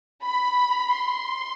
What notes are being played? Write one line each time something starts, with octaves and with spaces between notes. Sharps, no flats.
B5
C6